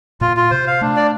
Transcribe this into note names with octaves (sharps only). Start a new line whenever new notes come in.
A#2 F4
F4
C3 C5
F5
A3 D4
D5